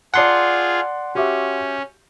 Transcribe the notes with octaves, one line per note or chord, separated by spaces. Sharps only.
F4 G#4 D5 F#5 A5 C6
C#4 F#4 G4 E5